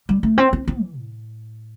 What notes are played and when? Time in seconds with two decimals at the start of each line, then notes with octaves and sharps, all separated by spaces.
0.09 G3
0.23 A3
0.38 C4
0.53 C4
0.68 C4
0.82 E3
0.97 A2